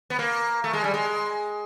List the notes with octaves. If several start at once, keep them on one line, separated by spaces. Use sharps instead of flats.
B3
A#3
A3
G#3
G3
G#3